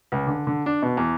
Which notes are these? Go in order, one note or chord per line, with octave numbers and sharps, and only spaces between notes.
C#2
D3
D3
D4
B2
E2